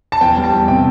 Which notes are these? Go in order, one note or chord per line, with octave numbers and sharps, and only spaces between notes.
A5
E2 G5
G3
A5
E2
C3 G5